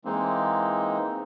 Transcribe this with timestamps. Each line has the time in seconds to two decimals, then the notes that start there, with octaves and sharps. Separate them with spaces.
0.05 E3 G#3 A#3 C4 D#4